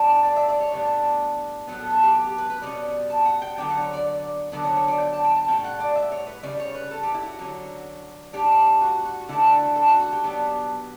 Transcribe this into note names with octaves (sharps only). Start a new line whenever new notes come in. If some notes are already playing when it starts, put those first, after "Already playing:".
Already playing: A2 G3 B3 D4
D5
E5
D5
C#5
A2 G3 B3 D4
A2 F#3 B3
A4
A4
G4
G4
G4
B4
B4
B2 G3 C#4 D5
A5
F#5
G5
D3 F#3 B3 D4 G5
F#5
C#5
D5
D3 F#3 B3 D4 D5
C#5
C#5
D5
G5
A5
G5
A5
A2 G3 C#4 G5
F#5
D5
E5
C#5
B4
C#3 G3 C#4 D5
C#5
B4
A4
G4
E4
F#4
D3 F#3 C#4
A2 G3 D4 G4
F#4
F#4
D3 A3 D4 E4
F#4
A4
F#4
F#4
G4
B2 F#3 B3 D4